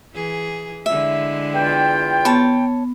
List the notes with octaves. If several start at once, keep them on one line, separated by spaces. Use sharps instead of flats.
E3 G#4
D3 G#3 E4 E5
E2 F4 G5
B3 C#5 A5